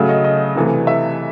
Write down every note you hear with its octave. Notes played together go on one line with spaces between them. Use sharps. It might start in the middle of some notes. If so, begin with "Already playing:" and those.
Already playing: C#3 F#3 A3
D#5
D#5
C3 E3 A3
E5